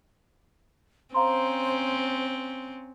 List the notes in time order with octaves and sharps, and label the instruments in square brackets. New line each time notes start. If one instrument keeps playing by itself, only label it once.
[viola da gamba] C4 C#4 [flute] C5 [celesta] F5 A#5 C6